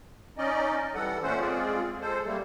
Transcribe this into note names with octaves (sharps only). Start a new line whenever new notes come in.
C#4 D#4 D5 D#5
E3 G3 A4 F#5
A#2 A3 C#4 C5 F#5
G#3 C4 F4 G#4 D5
G#3 A4 C5
G3 A3 A#3